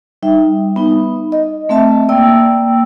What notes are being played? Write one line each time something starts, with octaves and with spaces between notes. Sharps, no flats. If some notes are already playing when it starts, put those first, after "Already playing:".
G3 D#4 E5
B3 D#4
D#5
A3 C4 E5 A5
A#3 D5 G5 E6